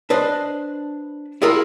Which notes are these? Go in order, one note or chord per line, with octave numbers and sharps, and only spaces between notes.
D4 B4 C5 D#5
E4 F4 G#4 A#4 E5